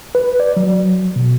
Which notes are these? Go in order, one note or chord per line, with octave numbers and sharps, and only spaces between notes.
B4
D5
F#3
B2